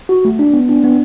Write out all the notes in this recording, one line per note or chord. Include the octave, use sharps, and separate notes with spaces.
F#4
A3
D4
B3
D4
B3